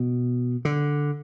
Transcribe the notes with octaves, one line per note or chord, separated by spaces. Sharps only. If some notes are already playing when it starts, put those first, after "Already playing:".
Already playing: B2
D3